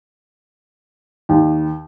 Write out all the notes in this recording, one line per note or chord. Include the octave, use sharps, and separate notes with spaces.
D#2